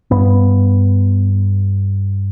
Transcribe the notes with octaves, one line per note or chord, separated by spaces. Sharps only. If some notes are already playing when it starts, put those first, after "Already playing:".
G2 B3